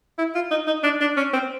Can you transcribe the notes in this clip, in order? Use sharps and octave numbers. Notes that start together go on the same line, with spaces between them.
E4
F4
D#4
D#4
D4
D4
C#4
C4